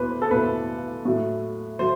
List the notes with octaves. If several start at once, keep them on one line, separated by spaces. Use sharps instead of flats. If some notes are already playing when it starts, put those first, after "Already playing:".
Already playing: E2 B2 A3 B4 C5
A4
E2 B2 A3 B4
A2 F#3 A3
F#3 A3 C5